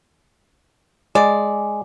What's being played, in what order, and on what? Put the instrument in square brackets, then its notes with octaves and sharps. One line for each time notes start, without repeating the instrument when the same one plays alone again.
[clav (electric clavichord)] G#3 [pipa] D5